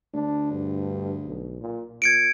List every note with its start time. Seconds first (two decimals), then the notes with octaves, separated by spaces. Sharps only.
0.14 D2 D4
0.52 G2
1.25 B1
1.61 A#2
2.02 A#2 G#6 C#7 D7